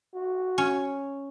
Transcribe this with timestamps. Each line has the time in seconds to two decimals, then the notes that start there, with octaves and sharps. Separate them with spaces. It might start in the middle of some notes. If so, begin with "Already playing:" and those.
0.14 F#4
0.58 C#4